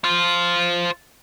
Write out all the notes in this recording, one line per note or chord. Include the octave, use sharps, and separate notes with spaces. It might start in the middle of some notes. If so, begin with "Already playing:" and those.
F4 C5